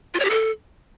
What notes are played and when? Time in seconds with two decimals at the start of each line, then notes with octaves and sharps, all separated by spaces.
0.14 F4
0.19 C#5
0.25 G4
0.30 A4